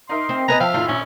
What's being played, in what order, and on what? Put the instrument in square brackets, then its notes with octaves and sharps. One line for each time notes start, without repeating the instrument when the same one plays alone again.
[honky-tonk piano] D#4 A#4 E5 [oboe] C6
[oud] C4
[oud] B3 B4 D#5 [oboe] G#5 [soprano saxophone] A#5
[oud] F3 [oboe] E5 [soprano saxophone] F5 [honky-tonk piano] G5 A5
[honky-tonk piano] F#1 A2 D#3 [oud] F4
[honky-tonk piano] A#1 [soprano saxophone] C#4